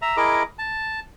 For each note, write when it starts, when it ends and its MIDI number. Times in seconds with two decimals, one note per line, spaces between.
0.02 0.17 76
0.02 0.17 82
0.17 0.43 64
0.17 0.43 68
0.17 0.43 70
0.17 0.43 75
0.17 0.43 86
0.59 1.00 81